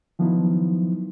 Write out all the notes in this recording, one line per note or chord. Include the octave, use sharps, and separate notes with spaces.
D#3 F3 F#3 B3 D#4 E4